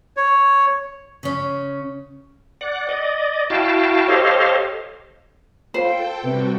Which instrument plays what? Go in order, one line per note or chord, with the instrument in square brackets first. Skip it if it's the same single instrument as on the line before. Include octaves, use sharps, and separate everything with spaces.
[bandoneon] C#5
[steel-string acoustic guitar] C#3 C#4
[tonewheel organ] D5 F#5
D5 D#5
E4 F#4 F5 G5 A5
G4 A4 C5 C#5 D#5 F5
[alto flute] F4 [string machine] A4 G5 [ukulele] C5
[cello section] C3 C4 [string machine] G3 F#4 G4 [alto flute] B4